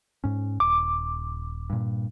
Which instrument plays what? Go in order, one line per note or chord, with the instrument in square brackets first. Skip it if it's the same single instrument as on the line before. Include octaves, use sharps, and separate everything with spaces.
[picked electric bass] G#2 C#4
[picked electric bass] D#1 [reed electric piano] D6
[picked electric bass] G2 A#2